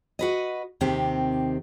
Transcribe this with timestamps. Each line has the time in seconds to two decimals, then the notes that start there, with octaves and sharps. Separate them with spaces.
0.19 F#4 B4 D#5
0.81 D#2 C3 D#3 C4 G4